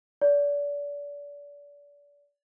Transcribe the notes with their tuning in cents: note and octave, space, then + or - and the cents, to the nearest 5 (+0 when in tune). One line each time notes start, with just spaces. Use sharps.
D5 -30